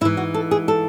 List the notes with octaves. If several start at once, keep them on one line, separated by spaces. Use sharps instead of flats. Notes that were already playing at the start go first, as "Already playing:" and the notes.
G#2 E3 E4
F#4
A4
G#4
A4